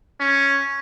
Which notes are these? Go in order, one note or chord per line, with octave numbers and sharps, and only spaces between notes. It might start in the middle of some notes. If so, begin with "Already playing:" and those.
C#4